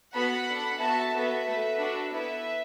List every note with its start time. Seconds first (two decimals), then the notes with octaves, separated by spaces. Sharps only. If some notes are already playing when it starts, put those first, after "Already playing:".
0.14 B3 F#4 A4 F#5 B5
0.47 D4 A4
0.80 B3 F#4 A4 E5 A5
1.13 B3 F#4 A4 B4 E5
1.46 A3 F#4 A4
1.78 D4 F#4 A4
2.11 B3 E4 A4 B4 E5